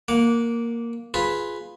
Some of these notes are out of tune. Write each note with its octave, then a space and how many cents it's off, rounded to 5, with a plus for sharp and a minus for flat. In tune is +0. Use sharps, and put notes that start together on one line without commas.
A#3 +0 F#5 -20 D6 -20
F4 +0 G#4 +0 B4 +0